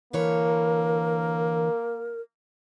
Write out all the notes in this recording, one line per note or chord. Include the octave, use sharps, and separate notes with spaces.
D3 E3 A#3 A#4 C#5